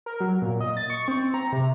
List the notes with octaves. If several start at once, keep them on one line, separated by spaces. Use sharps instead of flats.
A#4
F#3
A#2
D#5
A6
C#6
C4
A#5
C3